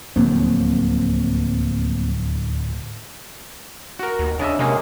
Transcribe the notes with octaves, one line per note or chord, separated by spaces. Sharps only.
D1 D#2 F3 F#3 A#3 C4
F#4 A#4
D#2
C#3 D4 D#5 E5
C3 G#3 A#3 C#4